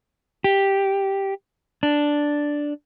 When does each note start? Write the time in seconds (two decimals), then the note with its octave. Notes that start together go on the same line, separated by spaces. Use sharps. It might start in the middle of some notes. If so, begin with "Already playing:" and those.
0.44 G4
1.83 D4